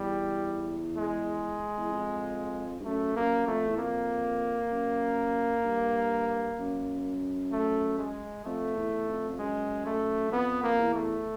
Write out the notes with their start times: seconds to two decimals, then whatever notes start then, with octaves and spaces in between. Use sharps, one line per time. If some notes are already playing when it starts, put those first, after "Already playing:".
Already playing: E2 G3
0.98 G#3
1.78 E2
1.91 F2
2.80 G2
2.85 F#2 A3
3.15 F#2 A#3
3.47 F2 A3
3.67 E2
3.78 F2 A#3
4.71 F#2
5.65 G2
6.59 F#2
7.52 A3
7.99 G#3
8.45 F2 A3
8.76 E2
9.08 F2
9.29 F2
9.39 F#2 G#3
9.86 A3
10.28 F#2
10.32 F2 B3
10.63 A#3
10.79 E2
10.94 A3